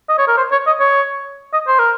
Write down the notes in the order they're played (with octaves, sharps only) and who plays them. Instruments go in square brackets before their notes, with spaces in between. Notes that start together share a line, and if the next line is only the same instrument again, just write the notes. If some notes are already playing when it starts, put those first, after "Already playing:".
[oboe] D#5
C#5
A#4
C5
C#5
D#5
C#5
D#5
C5
A#4